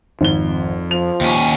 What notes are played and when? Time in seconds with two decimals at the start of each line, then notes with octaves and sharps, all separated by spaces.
0.21 G#1 F2 G7
0.91 F3 F7
1.21 D#2 C#4